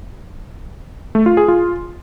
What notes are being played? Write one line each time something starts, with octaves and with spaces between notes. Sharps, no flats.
A3
F4
G#4
F4